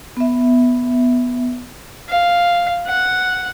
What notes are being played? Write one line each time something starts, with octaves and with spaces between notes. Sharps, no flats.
B3 E5
F5
F#5